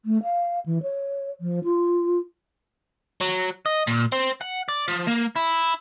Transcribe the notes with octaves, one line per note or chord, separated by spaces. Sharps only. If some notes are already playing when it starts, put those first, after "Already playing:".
A3
F5
E3
C#5
F3
F4
F#3
D#5
A#2
C4
F#5
D5
F3
A#3
E4